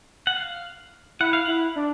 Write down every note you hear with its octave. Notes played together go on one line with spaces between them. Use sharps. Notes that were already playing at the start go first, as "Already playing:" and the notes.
F#5
F5
E4 F#5
F5
E4 F#5
D4